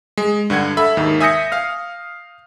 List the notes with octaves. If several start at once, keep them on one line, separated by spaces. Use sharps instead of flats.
G#3
G2 D3 F#5 G#6
A4 E5 B5
D#2 G#2 D#3
E5 G#5 D#6 G6 A#6 C#7
F5 F6